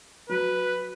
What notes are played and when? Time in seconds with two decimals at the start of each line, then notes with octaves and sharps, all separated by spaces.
0.29 F#3 B4